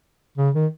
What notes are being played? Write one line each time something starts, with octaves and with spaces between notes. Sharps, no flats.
C#3
D#3